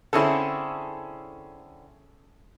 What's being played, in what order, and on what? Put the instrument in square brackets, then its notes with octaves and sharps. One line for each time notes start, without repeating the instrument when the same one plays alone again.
[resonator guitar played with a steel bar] D3 C4 E4 [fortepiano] C#4 G#4 A4